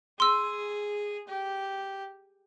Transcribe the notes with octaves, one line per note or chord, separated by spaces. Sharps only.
G#4 C6 E6
G4